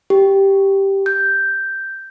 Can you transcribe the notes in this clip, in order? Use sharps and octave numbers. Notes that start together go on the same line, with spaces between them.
G4
G6